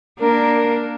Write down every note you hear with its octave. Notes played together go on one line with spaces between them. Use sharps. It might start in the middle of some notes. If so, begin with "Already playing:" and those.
A#3 D4 A#4